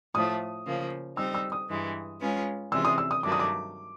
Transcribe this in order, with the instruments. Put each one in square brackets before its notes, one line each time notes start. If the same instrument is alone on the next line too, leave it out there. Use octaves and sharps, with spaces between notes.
[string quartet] A2 F3 A3 [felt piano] D#6
[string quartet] C#3 F3 A#3
[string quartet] G3 C4 D#4 [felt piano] E6
[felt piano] E6
D#6
[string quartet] G2 E3 G#3
G#3 C#4 F4 G#4 B4
[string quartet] C3 E3 G#3 C#4 F4 [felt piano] E6
[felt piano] D#6
E6
D#6
[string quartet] G2 D#3 F#3 A3 [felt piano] D6
[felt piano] D#6
D6